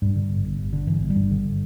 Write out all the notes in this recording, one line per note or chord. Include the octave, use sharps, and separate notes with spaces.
G2 G3
D3
G1
G1
G2
D3
G1 E3
G1
G3
G2
D3